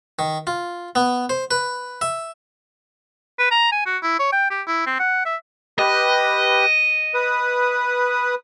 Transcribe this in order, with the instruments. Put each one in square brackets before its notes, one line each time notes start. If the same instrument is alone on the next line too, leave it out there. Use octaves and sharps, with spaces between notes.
[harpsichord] D#3
F4
B3
C5
B4
E5
[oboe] B4
A#5
G#5
F#4
E4
C#5
G5
G4
E4
C4
F#5
E5
[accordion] G4 B4 [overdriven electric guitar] D#5
[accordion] B4 D#6